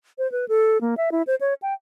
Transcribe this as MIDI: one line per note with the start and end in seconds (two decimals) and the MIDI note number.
0.18 0.30 72
0.32 0.45 71
0.49 0.80 69
0.81 0.95 58
0.97 1.10 76
1.12 1.22 64
1.27 1.35 72
1.41 1.54 73
1.62 1.73 79